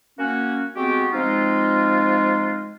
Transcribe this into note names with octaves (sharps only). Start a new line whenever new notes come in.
A#3 C#4 F#4
G#3 B3 C4 F#4 G4
F3 G#3 C4 D#4 F4